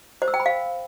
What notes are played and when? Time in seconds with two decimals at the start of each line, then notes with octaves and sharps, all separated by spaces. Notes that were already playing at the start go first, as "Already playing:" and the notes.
0.22 C5
0.28 E6
0.34 G5
0.40 B5
0.46 F5